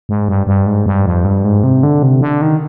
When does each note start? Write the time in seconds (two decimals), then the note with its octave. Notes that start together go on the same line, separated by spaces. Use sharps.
0.09 G#2
0.28 G2
0.47 G2
0.66 G#2
0.86 G2
1.06 F2
1.25 G2
1.44 G#2
1.64 C3
1.83 D3
2.03 C3
2.21 D3
2.42 D#3